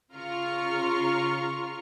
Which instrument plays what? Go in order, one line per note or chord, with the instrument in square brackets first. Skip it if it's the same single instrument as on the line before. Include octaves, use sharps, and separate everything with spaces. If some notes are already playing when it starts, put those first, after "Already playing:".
[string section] C#3 F4 A#5 C#6 F6